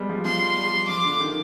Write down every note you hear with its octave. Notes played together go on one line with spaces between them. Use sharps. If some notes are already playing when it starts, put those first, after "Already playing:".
Already playing: G3 G#3 B3
F3
F3 C6
G3
F3 D6
D3
D#3